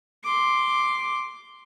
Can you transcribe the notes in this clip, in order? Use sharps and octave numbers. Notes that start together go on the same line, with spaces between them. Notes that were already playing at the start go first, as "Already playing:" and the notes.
C6 D6